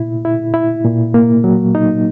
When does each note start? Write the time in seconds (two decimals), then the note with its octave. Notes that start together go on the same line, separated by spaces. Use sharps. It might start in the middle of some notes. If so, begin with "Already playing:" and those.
Already playing: A#2 E4
0.25 E4
0.54 E4
0.84 A#2
1.14 A#3
1.44 F#3
1.75 D#4